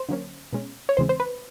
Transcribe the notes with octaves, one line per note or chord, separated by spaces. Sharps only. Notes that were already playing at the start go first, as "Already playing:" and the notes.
Already playing: C5
D3 F#3 A#3 C#4
B2 G#3 C#4
C#5
E2 C#3 E3 G#3 C4 C5
C5
B4